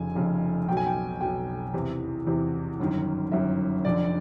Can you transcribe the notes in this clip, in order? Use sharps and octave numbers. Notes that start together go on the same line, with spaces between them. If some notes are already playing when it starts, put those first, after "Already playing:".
Already playing: F1 F2 C#3 G#5
F1 F2 C#3
B1 B2 G5
G#5
G5
B1 B2 G5
E2 C3 E3
E2 C3 E3
G1 F#2 D#3
G1 F#2 D#3 E5
F1 F2 D3 D5